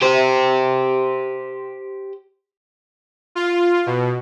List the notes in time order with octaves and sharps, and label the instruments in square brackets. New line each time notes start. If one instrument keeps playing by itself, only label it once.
[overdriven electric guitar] G4 C5
[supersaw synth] F4
B2